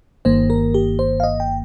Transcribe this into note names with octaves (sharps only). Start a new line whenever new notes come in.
G1 G2 D#3 A#3 C5
A#4
G4
C5
F5
D#5
G5